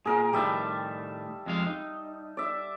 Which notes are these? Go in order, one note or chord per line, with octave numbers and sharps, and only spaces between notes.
A#2 G#4 A#4 F5
A2 D#3 G3 E5 A5
F2 G#3 F5
D#4
D5 E5